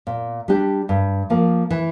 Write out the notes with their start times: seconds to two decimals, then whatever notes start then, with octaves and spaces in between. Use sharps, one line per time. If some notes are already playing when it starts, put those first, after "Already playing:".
0.07 A#2
0.48 G3 D4 G4
0.89 G2
1.30 F3 A#3
1.70 E3